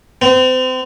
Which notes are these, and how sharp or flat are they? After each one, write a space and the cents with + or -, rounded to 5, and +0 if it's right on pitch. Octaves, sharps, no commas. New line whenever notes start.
C4 -35